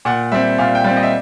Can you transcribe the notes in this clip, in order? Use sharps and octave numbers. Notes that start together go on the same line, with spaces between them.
A#2 F#5
G3 C4 E5
A#2 F5
G5
G3 C4
D#5
E5